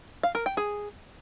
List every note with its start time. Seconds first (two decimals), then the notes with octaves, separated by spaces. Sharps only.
0.23 F5
0.35 A#4
0.46 G5
0.57 G#4